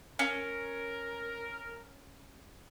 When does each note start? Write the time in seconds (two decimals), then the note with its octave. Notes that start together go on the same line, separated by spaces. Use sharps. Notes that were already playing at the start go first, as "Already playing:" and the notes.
0.19 C#4 A#4